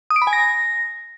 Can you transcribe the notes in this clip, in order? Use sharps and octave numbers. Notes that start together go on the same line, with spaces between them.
D#6
D7
B5
G#5
A#6